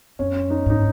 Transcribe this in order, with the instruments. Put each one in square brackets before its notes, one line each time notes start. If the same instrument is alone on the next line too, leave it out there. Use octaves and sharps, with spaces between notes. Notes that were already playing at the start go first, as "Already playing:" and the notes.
[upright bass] F#2 [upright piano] C#4
[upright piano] D#4
[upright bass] G#2 [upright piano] D#4